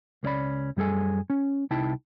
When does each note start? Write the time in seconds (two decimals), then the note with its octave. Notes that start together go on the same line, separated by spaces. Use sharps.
0.23 C#2 A#3 C#4 D5 B5
0.77 F#2 G3 G#4 A4 G#5
1.30 C#4
1.71 C2 D#4 E4 G5 A5